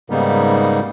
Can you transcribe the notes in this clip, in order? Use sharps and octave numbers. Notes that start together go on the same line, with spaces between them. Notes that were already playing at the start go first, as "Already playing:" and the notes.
G#2 C#3 G3 A#3 B3 D#4